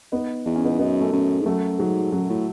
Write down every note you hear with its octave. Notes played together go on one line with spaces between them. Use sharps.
B3 D#4
E2 D#4
C#4
B3 D#4
F#2 B3 D#4
A3 C#4
F#2
G#2
F#2 F#3 A3
G#2 F#3
F#2 F#3
A2